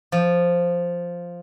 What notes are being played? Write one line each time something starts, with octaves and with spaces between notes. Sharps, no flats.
F3